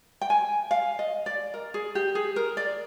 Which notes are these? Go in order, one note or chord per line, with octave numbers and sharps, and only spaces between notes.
G5
G#5
F5
D#5
D5
A#4
G#4
G4
G#4
A#4
D5